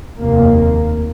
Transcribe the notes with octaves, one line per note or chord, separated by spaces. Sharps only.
F1 D#2 A#3